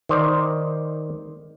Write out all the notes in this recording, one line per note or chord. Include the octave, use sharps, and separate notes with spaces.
D#3 C5 D5